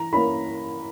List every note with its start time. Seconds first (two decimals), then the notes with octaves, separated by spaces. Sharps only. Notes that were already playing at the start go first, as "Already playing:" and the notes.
Already playing: E3 A#5
0.13 A#3 C#4 E4 B5